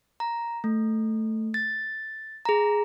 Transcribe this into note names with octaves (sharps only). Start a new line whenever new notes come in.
A#5
A3
A6
G#4 A#5